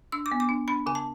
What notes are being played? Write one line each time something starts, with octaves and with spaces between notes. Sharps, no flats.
D4 E6
D6
B3
D6
D4
D4 B5
C#3 G#5
A5